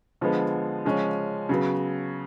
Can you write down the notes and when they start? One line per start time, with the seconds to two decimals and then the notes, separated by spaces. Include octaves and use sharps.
0.21 D3 F3 G#3 B3
0.85 C#3 F3 G#3 C#4
1.49 C#3 F#3 B3